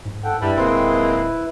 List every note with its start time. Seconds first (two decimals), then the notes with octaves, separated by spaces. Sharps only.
0.05 G#2
0.24 A4 F#5 G5
0.42 G2 G3 E4 B4
0.56 D1 D#2 G#3 C4